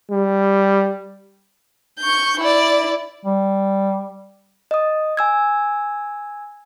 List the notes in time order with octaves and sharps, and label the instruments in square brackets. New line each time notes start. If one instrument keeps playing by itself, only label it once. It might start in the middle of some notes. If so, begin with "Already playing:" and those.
[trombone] G3
[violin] C#6 G6
E4 D5
[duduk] G3
[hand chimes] D#5 D#6
G#5 E6 G#6